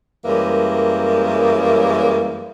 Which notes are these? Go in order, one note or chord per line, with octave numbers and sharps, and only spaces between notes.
F#2 E3 G3 G#3 A#3